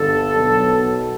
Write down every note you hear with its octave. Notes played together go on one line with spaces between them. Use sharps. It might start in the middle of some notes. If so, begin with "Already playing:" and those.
Already playing: G1 G2 D3 A4
B1 B2 F#3